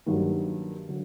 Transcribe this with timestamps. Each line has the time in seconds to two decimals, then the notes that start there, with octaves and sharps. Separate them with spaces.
0.06 G2 D#3 F#3 A#3 D#4
0.89 D3 F#3